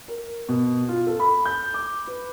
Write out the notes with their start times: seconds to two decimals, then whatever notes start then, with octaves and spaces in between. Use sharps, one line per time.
0.08 A#4
0.49 B2
0.88 F4
1.07 A4
1.20 B5
1.45 G6
1.74 D6
2.07 B4